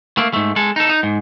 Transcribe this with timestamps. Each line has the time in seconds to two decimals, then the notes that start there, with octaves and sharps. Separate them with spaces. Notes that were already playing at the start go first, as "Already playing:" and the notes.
0.18 A3 A#3
0.33 G#2 A3
0.56 G#3 A4
0.76 D#4 A4
0.89 D#4
1.03 G#2